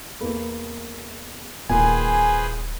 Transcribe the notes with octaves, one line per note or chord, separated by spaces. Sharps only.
E2 A#3 B3
D1 A#2 D#3 G#4 B4 C5 G#5